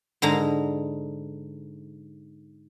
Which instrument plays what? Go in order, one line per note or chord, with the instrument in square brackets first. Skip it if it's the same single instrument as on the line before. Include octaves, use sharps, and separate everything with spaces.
[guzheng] G#2 D3 G#3 A#5